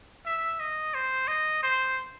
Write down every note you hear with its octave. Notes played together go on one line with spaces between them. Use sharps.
E5
D#5
C5
D#5
C5